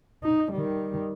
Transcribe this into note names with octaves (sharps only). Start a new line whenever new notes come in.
D#4
D#3 G3